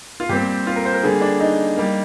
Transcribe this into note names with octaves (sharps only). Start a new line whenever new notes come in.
F4
A#2 G3 C4 G4
F4
A#4
C5
A#4
D3 G3 A#3 G#4
D4
D#4
G3 A#3